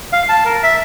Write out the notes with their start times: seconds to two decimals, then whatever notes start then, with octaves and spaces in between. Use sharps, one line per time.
0.13 F5
0.29 A5
0.45 A#4
0.63 E5